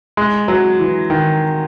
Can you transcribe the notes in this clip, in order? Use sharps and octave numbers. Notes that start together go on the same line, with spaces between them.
G#3
F#3
E3
D#3